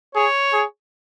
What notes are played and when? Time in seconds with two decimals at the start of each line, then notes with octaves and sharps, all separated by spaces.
0.15 G#4 C#5
0.53 G#4